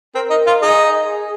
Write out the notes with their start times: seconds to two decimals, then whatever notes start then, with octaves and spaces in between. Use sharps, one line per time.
0.14 C4 A#4
0.30 D#4
0.47 F4
0.62 D#4 G#4